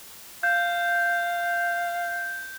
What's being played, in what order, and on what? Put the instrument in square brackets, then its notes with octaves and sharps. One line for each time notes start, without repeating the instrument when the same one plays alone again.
[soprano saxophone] F5 [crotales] G6